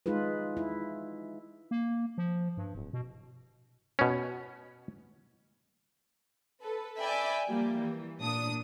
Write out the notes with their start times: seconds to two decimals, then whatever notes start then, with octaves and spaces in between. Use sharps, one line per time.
0.06 G#3 D#4 F4 G#4 B4
0.57 E4
1.71 A#3
2.18 F3
2.57 G2
2.75 D1
2.93 B2
3.99 B2 C#4
6.63 A4 B4
7.00 D5 E5 G5 G#5 B5
7.49 F3 G3 A#3
7.79 E3
8.19 A#2 D4 D#6